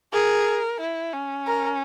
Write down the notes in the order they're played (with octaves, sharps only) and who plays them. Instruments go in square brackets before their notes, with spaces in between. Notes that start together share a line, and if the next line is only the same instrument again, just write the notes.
[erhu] G#4 [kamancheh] A#4
[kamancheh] E4
C#4
[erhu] A#4